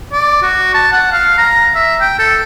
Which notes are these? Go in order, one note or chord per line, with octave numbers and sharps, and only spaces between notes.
D5
F#4
A5
F#5
F5
A#5
E5
G5
A4